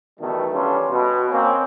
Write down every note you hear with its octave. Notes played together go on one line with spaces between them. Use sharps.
E2 B2 D#3 E3 G3 A3
E3 G3 C#4 D4 F4 A4
B2
A#3 C4 C#4